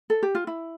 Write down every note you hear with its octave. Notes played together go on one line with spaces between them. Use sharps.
A4
G4
F4
E4